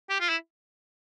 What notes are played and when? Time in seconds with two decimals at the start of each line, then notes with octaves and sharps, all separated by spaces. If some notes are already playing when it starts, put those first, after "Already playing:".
0.10 G4
0.20 F4
0.29 E4